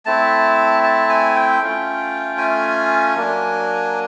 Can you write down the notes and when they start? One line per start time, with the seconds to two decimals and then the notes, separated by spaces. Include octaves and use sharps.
0.06 A3 C4 E4 A5
0.83 A5
1.09 G#5
1.35 G5
1.61 A3 C#4 F4
2.38 G#5
3.15 F#3 A#3 D4